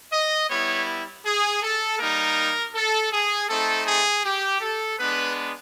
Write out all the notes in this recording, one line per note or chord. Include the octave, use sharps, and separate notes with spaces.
D#5
G3 B3 E4 C#5
G#4
A4
G3 A#3 D#4 A#4
A4
G#4
A3 C4 D#4 A4
G#4
G4
A4
G#3 B3 D4 B4